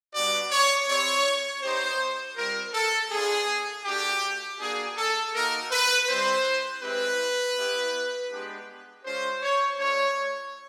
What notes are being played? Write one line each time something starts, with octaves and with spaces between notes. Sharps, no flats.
G3 B3 D4 F#4 D5
C#5
C4 E4 G4 C#5
B3 D#4 G4 C5
G3 C4 F4 A#4
A4
B3 D4 F4 G#4
A3 D4 F#4 G4
A#3 D4 F#4 G#4
A4
A#3 D#4 F#4 A#4
B4
G3 C4 E4 C5
G#3 C4 E4 G4 B4
B3 E4 G4
G#3 B3 D4 G4
G#3 C#4 F4 C5
C#5
A3 D4 F4 C#5